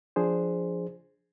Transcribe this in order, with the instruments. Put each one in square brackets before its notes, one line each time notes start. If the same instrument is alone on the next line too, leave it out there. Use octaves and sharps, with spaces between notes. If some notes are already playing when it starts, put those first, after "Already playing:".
[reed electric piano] F3 D4 G#4 C5